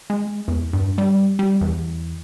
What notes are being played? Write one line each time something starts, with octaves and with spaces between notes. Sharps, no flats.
G#3
E2
G2
G3
G3
E2